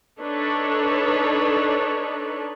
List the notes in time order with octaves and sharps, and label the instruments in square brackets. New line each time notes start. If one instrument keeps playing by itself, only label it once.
[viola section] D4 D#4 A4 B4 C#5